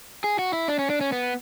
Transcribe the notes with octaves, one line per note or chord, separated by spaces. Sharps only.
G#4
F#4
E4
D4
C#4
D4
C#4
B3